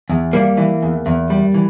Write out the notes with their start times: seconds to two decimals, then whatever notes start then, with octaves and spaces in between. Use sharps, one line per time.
0.10 E2
0.33 G3 A#3
0.57 E3
0.82 E2
1.06 E2
1.30 G3
1.54 E3